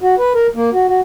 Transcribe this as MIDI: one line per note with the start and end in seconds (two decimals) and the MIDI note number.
0.01 0.15 66
0.18 0.33 71
0.35 0.47 70
0.55 0.70 58
0.73 0.86 66
0.88 1.01 66